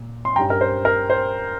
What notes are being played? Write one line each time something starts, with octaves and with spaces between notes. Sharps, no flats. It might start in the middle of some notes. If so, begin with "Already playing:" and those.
Already playing: A#2
C6
G2 G3 C#4 G5 A#5
A#4
C5
A#4
C5